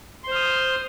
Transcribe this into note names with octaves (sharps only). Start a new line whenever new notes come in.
C5 C6 D#6 F6